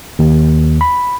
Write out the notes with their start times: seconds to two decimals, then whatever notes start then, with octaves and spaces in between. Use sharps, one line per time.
0.19 D#2
0.81 B5